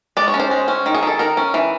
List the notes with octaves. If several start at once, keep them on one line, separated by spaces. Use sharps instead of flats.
G#3 D5
C#5
C#4
C5
G#3
C#4
D#3
G#4
D#3 A4
D#3 A#4
C#4
E3